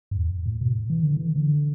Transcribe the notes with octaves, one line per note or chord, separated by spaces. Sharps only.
G2
E2
A2
B2
E3
D3
E3
D3